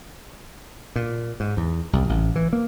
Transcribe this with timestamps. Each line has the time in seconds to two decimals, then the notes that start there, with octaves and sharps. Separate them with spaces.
0.96 A#2
1.40 G#2
1.57 E2
1.93 C2
2.09 A1
2.36 E3
2.53 A#3